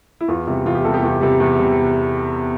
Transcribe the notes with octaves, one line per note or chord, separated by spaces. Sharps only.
E4
E2 F4
C3 G3
E2 F4
G4
C3 G3 A4
G4
E2 F4
C3 G3
E2
C3 G3